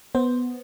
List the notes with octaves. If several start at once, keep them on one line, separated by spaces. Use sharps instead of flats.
B3 C5